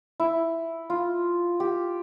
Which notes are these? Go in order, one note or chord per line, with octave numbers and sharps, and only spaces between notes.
E4
F4
G4